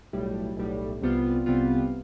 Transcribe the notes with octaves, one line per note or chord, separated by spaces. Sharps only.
B1 A2 G3
B1 A2 G3
C2 C3 G3 B3 F4
C2 C3 G3 B3 F4